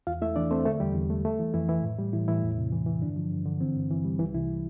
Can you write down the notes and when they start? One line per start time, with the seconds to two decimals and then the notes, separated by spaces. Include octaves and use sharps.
0.07 E2 F4 F5
0.22 A3 E4 E5
0.36 E3 D4 D5
0.51 A3 C4 C5
0.66 D3 A3 A4
0.80 E2 G3 G4
0.95 E2
1.10 A3
1.25 A3
1.39 E3
1.54 F2 E3 E4
1.69 E3 E4
1.83 A2
1.99 G3
2.13 A2 E3 E4
2.28 A2 E3 E4
2.43 E2
2.58 C3
2.72 E3
2.86 E3
3.01 G2 D3 D4
3.16 F3
3.31 G2
3.45 D3
3.60 E3 C4
3.76 G2
3.90 E3
4.05 G3
4.19 C2 E3 E4
4.34 C2 E3 E4